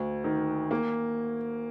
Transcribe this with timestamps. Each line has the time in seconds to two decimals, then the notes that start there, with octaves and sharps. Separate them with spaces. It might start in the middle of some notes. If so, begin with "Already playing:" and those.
Already playing: D2
0.24 D#3
0.71 A#3